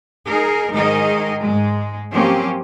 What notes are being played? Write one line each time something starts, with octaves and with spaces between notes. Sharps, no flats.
D#4 G#4 A#4
G#2 D#3 D#4 G#4 A#4 D#5
G#2 G#3
F3 F#3 A#3 C4 C#4 G4